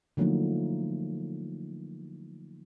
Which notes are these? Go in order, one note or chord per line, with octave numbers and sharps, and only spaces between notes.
D3 F3 F#3 A3 A#3 D#4